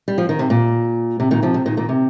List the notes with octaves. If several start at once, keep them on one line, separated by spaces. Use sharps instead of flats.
G3
F3
D#3
C3
A#2
C3
A#2 D#3
C3 F3
C3
A#2 D#3
A#2 D#3
C3